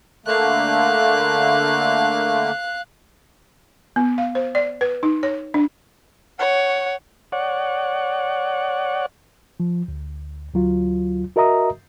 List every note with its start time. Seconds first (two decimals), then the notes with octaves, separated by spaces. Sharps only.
0.26 D3 A3 A#3 F5 F#6
3.96 B3
4.18 F5
4.35 C5
4.55 D5
4.81 B4
5.03 D#4
5.23 C#5
5.54 D4
6.39 C#5 F#5
7.32 C#5 D5 F#5
9.60 F3
9.88 D2
10.54 D2 F#3 F4
11.36 F#4 A#4 D#5 E5 A#5 D#6